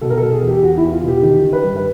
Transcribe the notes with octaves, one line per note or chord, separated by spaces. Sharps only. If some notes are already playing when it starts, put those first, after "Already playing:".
B2 A4
A#4
B2 A4
G#4
E2
G4
E2 F#4
E4
E2
F4
B2 G4
D#3 G4
D#3
B4
G2
B4